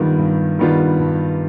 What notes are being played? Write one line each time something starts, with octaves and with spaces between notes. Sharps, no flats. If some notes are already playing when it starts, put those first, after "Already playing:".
Already playing: G2 D#3 G3 B3 F4
G2
D#3 G3 B3 F4
G2